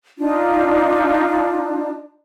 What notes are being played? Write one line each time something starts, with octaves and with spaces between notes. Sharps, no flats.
D4 D#4 F4